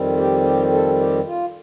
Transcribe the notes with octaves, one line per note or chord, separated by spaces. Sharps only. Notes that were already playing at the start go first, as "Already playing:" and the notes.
Already playing: F2 D#3 G3 C4
G4
G4
A4
G4
F4